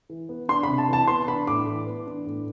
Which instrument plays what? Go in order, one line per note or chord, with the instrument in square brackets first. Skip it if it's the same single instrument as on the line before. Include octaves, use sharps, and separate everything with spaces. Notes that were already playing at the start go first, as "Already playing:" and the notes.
[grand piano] E3
B3
D4 C6
C3 B5
A5
E3 A5
B3 C6
D4 B5
A2 D6
E3
B3
D4
A2